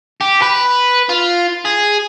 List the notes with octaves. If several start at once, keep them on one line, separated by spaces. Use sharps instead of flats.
G4
B4
F4
G#4